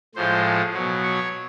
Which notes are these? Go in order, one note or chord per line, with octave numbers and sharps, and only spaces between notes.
A2 F3 G#3 C5
B2 F#3
C#5